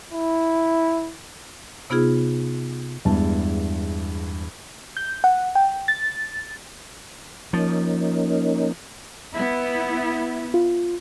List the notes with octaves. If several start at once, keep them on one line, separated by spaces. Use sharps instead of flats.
E4
C3 B3 D#4 F4 G#4
E2 G2 G#3 A5
G6
F#5
G5
A6
F3 A#3 C#4 D#4
B3 E4
F4